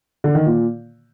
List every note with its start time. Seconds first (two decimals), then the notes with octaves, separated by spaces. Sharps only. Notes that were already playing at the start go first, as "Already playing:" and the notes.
0.24 D3
0.35 D#3
0.46 A#2